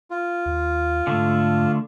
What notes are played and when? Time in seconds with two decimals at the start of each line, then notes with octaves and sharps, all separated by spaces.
0.11 F4
0.46 D#2
1.07 G#2 D3 A3